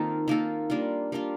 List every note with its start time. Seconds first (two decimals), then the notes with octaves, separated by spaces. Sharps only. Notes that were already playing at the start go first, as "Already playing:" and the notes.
Already playing: D#3 A#3 C4 F4 A4
0.28 D#3 A#3 F4 A4
0.70 G3 A#3 D4 F4
1.12 G3 A#3 D4 F4